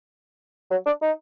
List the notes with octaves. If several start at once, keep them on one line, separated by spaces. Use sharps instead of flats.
F#3
D4
D#4